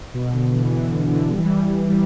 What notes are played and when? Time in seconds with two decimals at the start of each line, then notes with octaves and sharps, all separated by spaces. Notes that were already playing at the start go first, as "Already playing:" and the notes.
0.14 B2
0.33 D3
0.53 E3
0.72 E3
0.92 D3
1.12 D3
1.31 G3
1.38 E3
1.45 G3
1.90 G3